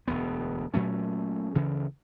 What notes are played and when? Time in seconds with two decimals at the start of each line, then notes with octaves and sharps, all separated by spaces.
0.08 E1 D2 B3
0.74 A#2 F#3 A3 C#4
1.55 D2 C#3 E3